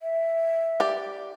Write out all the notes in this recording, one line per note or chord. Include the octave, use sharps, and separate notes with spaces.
E5
G4 D5